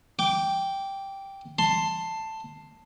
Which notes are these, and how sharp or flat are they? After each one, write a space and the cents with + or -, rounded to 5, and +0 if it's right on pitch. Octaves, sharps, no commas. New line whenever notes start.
G5 +0 D6 -15
A5 +10 C6 +0